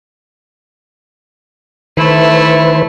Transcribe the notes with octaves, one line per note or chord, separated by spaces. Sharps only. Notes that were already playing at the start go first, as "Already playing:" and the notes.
D#3 A3 E4 B4 C5